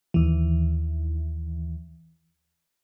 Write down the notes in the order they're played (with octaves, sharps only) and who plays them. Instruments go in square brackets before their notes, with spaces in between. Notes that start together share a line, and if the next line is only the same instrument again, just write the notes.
[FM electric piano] D#2 E3